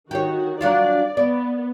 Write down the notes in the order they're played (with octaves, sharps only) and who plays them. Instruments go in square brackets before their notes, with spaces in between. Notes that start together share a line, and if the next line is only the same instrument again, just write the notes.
[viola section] D#3 F#4 [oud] G4 C#5
[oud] F#3 D4 F4 [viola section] D5
[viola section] B3 [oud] D5